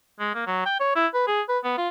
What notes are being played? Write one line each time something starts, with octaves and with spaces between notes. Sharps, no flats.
G#3
A#3
F#3
G5
C#5
E4
B4
G#4
B4
B3
F4